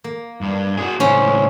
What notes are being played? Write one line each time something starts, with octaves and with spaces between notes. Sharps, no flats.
A#3
G2
F#4 G#4
C#2 A2 C#4 C5